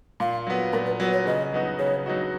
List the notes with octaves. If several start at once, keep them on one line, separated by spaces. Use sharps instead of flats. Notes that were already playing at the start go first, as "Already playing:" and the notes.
A#2 F5
F#3 B3
A#2 A#4
B4
F#3 B3 B4
C#5
C#3 D#5
F#3 B3 D#4 F#4
C#3 C#5
F#3 B3 D#4 F#4